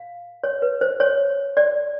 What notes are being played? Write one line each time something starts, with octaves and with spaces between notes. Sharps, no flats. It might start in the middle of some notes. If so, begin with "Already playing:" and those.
Already playing: F5
C#5
B4
C5
C#5
D5